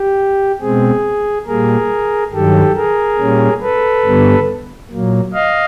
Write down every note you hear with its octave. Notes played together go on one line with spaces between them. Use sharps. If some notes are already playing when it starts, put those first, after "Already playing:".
Already playing: G4
B2 G#3 C4 G#4
A#2 G3 A#3 G#4 A#4
G2 D#3 F#3 G4 A4
G#4 A#4
A#2 G3 A#3 C#4
A4 B4
G2 D3 G3 B3
A#2 F#3 A#3
D#5 F5